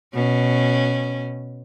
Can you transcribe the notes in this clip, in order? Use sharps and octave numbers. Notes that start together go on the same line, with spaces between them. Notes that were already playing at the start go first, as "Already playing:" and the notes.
B2 C#4